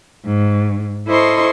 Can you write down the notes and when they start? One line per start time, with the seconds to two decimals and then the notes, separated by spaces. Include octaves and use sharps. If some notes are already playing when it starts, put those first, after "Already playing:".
0.24 G#2
1.06 E4 A4 C5 D#5 C6 C#6